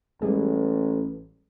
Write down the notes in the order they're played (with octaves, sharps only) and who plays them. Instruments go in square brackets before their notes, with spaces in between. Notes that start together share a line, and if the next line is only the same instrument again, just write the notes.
[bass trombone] A1 [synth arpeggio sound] G3 G#3 G#4